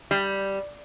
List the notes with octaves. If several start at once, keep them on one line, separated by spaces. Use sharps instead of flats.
G3